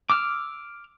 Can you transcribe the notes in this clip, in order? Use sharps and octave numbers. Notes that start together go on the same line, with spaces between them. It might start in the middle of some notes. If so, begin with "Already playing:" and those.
D6 E6 F6